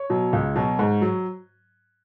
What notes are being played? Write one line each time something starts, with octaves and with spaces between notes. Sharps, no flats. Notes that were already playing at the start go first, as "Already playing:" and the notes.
Already playing: C#5
B2 F#3
C#2
B2 F#3
G#2
F#3